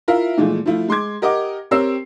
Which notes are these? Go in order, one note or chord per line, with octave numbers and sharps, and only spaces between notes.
E4 F4 A#4 E5 F5
A#2 E3 F3 G#3 A3
F3 A3 E4 F4
G#3 C6 D6 G#6
G4 A#4 D#5 F#5 D6
C4 G4 A#4 C#5 E6 C7